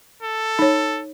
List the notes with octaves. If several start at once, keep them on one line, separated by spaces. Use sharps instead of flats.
A4
D#4 C#5